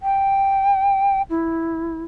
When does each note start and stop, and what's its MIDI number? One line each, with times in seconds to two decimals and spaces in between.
0.02 1.22 79
1.30 2.04 64